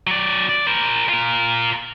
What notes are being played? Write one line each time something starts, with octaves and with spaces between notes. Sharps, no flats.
F#3 D5
D5
A#4 C5
F4 A#4